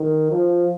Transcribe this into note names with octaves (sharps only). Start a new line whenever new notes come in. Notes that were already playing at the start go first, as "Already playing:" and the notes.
Already playing: D#3
F3